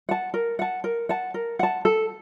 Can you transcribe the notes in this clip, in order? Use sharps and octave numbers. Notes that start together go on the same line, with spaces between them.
F#5 A5
A#4
F#5 A5
A#4
F#5 A5
A#4
F#5 A5
A4